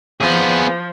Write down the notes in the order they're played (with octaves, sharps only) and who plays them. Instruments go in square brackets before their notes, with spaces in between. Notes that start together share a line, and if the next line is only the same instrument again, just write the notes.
[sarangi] F3 [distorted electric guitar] B3 G#4